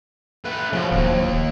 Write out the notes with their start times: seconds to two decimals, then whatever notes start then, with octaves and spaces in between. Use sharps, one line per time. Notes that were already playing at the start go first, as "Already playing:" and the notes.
0.45 A3 B4
0.73 C#3 F3 F#4
0.91 D1 D#2